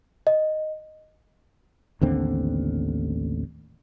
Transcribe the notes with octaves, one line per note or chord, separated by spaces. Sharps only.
D#5
A1 D#2 D3 C4